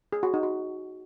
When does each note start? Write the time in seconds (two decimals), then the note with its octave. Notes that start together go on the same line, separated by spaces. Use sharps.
0.13 G#4
0.23 F#4
0.34 D#4
0.43 F#4